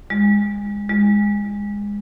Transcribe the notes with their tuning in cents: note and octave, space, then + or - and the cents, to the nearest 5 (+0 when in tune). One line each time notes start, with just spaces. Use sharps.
G#3 -25
G#3 -20